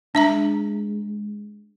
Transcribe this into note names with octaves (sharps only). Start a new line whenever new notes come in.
G#3 D4 E5 A#5